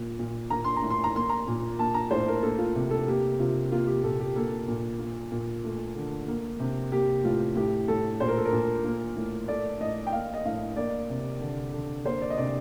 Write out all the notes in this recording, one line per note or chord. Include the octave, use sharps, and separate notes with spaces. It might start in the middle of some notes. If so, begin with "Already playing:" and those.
Already playing: A#2
A#2
A#3 A#5
C6
A#5
A2
C6
A#5
A#3 C6
A#5
A#2
A#3 A5
A#5
A2 C5
A#4
A#3 A4
F4
C3
A4
A#3 G4
C3 F4
A#3 F4
G4
A#2 A4
G4
A#3 A4
A#2
A#3
A#2
A3
D3
A#3
C3
A#3 G4
A2 F4
A2 G4
A2 A4
A#2 C5
A#4
A4
A#4
A#2
A#3
A2
A3 D5
A2 D#5
G5
A#3 F5
D#5
A2 F5
A#3 D5
C3
D3
D3
A#3 C5
D5
D#5
C3 D5